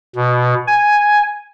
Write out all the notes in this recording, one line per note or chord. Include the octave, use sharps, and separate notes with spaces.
B2
G#5